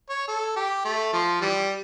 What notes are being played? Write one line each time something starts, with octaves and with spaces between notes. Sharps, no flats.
C#5
A4
G4
A3
F3
E3 G3